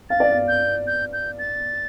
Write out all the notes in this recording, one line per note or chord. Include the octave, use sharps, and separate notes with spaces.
F5 A6
D5
F5
G6
G6
G6
A6